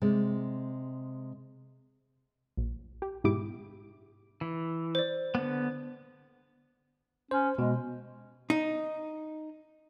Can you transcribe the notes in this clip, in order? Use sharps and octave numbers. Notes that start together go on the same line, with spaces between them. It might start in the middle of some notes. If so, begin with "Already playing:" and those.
C3 G#3 D5
A#1
G4
G#2 B2 E4 G4 D6
E3
C5 D5
D3 B3
C#4 C5
B2 G#3
D#4